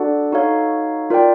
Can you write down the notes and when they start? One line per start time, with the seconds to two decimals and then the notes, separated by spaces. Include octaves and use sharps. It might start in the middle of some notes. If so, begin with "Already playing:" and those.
Already playing: D4 F#4 A4 D5 F#5
0.32 D#4 F#4 A4 C#5 F5
1.10 F4 A#4 D5 G5